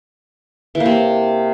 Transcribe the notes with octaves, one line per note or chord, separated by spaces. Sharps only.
E3
A#3
C3